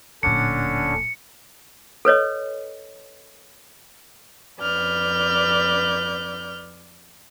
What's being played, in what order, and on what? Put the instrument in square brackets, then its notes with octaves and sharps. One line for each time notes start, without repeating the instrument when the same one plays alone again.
[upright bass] D1 A#2 [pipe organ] D3 C#4 D4 [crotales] C#7
[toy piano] A4 B4 C#5 D#5
[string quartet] F2 B4 D5 F6 G6